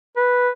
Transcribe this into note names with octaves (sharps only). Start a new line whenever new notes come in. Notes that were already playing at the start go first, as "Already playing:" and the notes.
B4